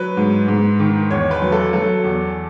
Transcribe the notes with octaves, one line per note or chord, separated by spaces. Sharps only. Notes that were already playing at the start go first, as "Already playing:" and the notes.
Already playing: F#3 B4
G#2
G#2
D#3
E2 C#5
B4
F#3
A4
F#3 A4
E2